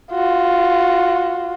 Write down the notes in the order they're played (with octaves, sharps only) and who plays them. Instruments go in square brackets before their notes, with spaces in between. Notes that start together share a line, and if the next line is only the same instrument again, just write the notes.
[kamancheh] F4 F#4